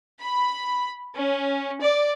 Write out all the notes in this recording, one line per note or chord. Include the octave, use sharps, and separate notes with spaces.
B5
C#4
D5